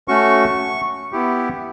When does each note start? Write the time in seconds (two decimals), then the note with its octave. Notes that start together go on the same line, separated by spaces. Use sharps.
0.08 A3 C#4 F#4 C#6
1.13 B3 E4 G4